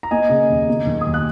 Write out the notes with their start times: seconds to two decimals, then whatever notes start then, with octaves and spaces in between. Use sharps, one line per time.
0.03 A#5
0.11 A#3 D#5 G#5
0.29 C#3
0.50 D#2
0.69 A#3
0.86 D#3
1.01 D#6
1.06 D#2
1.14 F#6